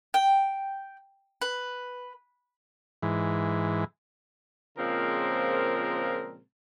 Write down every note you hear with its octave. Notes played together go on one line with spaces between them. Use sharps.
G5
B4
G#2 E3
A#2 C#3 F3 G#3 C4 A#4